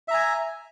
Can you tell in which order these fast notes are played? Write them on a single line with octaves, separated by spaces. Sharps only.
E5 A#5 G#5